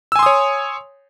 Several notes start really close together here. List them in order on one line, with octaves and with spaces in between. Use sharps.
E6 G#5 C6 D#6 C#5